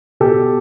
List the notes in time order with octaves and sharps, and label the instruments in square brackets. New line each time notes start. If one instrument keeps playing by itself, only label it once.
[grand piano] B2 G4 A4